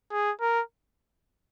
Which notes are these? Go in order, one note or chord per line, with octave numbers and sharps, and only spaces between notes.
G#4
A#4